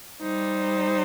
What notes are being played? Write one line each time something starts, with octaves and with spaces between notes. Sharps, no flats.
G3 D#4 C5